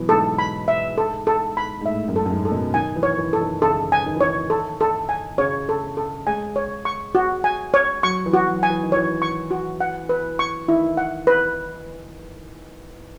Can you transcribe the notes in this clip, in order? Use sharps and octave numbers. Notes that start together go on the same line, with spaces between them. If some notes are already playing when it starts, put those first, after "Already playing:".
Already playing: B2 E3 F#3
G#2 A4
B5
E5
A4
A4
B5
G#2
A2 E5
F#2
A4
F#2
G#2
A4
B2
D#3 G#5
E3
C#5
E3
A4
D#3
C#3 A4
G#5
D#3
E3 C#5
D#3
A4
A4
G#5
C#3 C#5
A4
A4
G#3 G#5
C#5
C#6
F#4
G#5
C#5
F#3 C#6
E3
F#4
F#3
G#5
E3
D#3
E3 C#5
C#6
F#4
F#5
B4
C#6
D#3 E4
F#5
B4